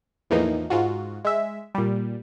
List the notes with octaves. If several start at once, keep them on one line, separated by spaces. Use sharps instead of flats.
E2 A2 E3 F3 A#3 D#4
G#2 F4 F#4
G#3 E5
A#2 G3